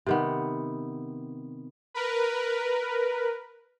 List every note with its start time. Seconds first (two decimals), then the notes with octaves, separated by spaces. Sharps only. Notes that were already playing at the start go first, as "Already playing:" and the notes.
0.06 C3 D#3 B3
1.94 A#4 B4